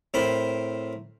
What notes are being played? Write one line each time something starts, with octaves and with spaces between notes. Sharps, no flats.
A2 C4 A#4 C5 B5 C6